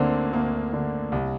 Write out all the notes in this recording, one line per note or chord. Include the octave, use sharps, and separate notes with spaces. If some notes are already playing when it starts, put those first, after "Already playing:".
Already playing: D2 D3 A#3 C4 D4
D2 A#3
D3
C2